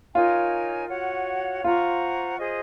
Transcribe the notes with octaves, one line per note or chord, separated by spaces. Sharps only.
D#4 F4 A#4 C#5 G#5
F#4 C#5 F#5
F4 C5 F#5 A#5 C#6
G#4 C5 D#5